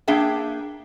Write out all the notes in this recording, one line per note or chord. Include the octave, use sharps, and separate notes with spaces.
A#3 D4 G#4 E5 G5